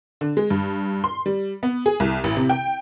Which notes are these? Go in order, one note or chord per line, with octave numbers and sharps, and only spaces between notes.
D3
G#3
G2
C6
G3
B3
G#4
C2
A1
C3
G5